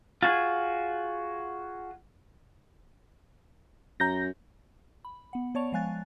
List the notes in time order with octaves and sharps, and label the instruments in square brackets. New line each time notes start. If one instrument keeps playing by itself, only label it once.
[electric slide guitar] F4 F#4 G#4
[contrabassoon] F#2 [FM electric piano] A#5 G6 A#6
[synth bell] B5
B3 F#5
B3 C#5 D5 A5 C#6 F7
F3 G#3 F5 G#5 F#6 A6